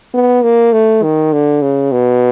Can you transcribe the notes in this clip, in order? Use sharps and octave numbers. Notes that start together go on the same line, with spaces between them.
B3
A#3
A3
D#3
D3
C#3
B2